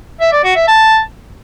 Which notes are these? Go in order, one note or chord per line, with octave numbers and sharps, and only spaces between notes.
E5
D5
F#4
E5
A5